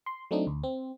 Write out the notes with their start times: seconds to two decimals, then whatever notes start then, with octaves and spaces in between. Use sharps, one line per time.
0.06 C6
0.31 F#3 A3 C4 D4 D#4
0.47 D2
0.64 C4